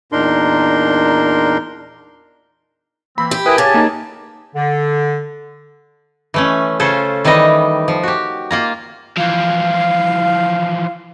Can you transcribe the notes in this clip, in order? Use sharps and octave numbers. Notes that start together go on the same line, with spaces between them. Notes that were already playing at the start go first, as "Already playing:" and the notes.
E2 A#2 D4 D#4 A#4 C6
E3 A#3 C4 B5
G4
E4 G#4 A#4 B4 E5 G5 G#5 D#6
C#3 G4 G#5 A5 G#6 A6
A#3 D#4
D3
E3 A3 C#4
C#3 C#4 F4 A4 C5
D#3 E3 G3 D#4 D#5
F3
F#4 G4
A#3 F4 A#5
E3 F3 F5